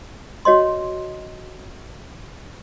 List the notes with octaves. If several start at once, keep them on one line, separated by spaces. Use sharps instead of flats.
F#4 C#5 D#5 C6